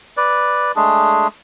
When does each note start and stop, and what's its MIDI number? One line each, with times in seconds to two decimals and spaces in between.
0.17 0.72 71
0.17 0.72 74
0.76 1.27 56
0.76 1.27 57
0.76 1.27 62
0.76 1.27 68